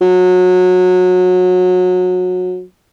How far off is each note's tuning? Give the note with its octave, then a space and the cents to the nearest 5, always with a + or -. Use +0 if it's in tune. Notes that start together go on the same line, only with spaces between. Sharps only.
F#3 -25